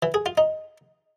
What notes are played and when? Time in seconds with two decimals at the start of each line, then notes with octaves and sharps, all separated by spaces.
0.03 E3
0.14 G#4
0.26 F4
0.38 D#4